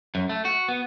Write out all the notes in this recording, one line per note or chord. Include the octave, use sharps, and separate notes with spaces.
F#2
A3
F#4
B3